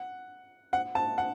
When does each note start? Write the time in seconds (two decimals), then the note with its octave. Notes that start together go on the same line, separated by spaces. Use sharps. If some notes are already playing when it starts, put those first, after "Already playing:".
Already playing: F#5
0.73 F#5
0.95 A5
1.18 F#5